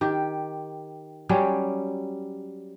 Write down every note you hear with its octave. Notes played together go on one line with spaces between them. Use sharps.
D#3 G4
F#3 G3 C#4 G4